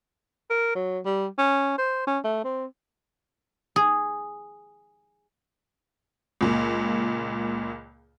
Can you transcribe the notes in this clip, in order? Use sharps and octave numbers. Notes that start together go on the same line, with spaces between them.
A#4
F#3
G3
C#4
C5
C#4
A3
C4
G#4
C#2 A#2